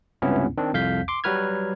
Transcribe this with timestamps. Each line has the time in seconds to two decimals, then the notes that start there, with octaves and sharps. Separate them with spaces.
0.22 C#2 G2 C3 B3 C#4 E4
0.58 D#3 C4 D4
0.73 C2 F2 F5 G6 B6
1.08 C6 D6
1.24 F#3 G3 F#4 B4 F6 G#6